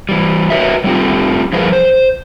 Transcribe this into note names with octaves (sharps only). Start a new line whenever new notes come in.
E3 G3
F#4 A#4 B4 C#5 D#5 E5
G3 A3 C4 F4 G4
F3 G3 E4 G#4 A#4 B4
C5